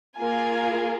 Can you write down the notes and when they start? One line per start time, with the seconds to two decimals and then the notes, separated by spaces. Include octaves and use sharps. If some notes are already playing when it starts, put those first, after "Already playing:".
0.18 A#3 F4 G#4 G#5